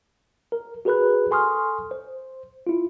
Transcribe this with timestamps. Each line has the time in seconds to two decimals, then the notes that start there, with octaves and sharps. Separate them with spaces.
0.52 A#4
0.85 F#4 G#4 A#4 B4 B5 F#6
1.31 A4 G#5 C6 C#6 D#6 F6
1.91 C5
2.67 E4 F4